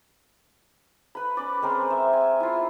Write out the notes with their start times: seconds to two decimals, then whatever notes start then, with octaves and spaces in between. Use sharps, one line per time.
1.15 B4 B5
1.37 C#4 D5
1.62 G#3 C4 A#4 G#5
1.90 E5
2.13 G#5
2.40 E4 F4